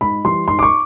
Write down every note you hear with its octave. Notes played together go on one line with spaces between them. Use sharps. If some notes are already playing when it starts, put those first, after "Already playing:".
G#2 B5
E3 G3 C6
G#2 C6
D6
C#6